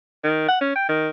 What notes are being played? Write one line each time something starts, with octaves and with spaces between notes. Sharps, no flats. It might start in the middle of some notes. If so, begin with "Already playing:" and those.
D#3
F#5
C#4
G5
D#3